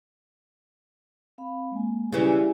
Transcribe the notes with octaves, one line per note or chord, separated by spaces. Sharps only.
C4 F5 B5
G#3 A#3 G#5
C#3 E3 G3 C#4 E4